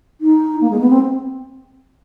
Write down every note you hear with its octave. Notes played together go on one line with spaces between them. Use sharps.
D#4
A#3
G#3
B3
C4